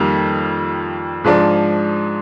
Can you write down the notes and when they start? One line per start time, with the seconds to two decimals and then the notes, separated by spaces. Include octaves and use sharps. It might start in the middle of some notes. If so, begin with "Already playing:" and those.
Already playing: F2 D#3 G3 A#3
1.24 G#2 F3 G#3 D4